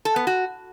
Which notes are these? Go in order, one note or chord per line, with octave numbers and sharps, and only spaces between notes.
A4
B3
F#4